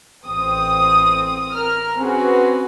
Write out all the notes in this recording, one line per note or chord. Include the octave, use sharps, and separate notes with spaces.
A1 C4 D#6
A#4 F6
C4 C#4 F#4 G#4 B4